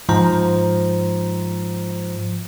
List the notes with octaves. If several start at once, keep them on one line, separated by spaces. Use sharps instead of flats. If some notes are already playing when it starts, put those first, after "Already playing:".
G#2 F3 C5 A#5